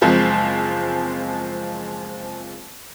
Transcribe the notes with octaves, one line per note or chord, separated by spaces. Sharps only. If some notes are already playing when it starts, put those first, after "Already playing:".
F#1 F3 G#3 C4